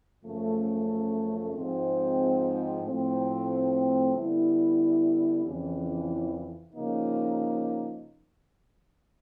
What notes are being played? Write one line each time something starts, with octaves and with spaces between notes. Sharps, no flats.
F#2 C#3 F3 A3
G#2 F3 G#3 C4
A2 F3 A3 C4
D3 G3 B3 E4
F2 C#3 E3
C#3 F3 A#3 D#4